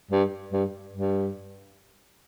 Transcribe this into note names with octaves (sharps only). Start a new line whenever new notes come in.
G2
G2
G2